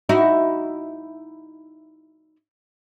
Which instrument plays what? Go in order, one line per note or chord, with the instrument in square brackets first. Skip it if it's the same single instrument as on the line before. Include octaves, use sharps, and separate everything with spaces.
[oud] D#4 E4 F#4